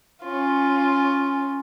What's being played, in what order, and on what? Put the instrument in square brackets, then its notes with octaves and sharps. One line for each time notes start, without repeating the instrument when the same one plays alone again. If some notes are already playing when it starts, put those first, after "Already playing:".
[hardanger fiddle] C#4 F4